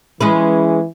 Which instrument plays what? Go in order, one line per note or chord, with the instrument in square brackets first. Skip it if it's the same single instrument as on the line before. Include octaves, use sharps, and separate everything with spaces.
[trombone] E3 [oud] G#3 C#4 B4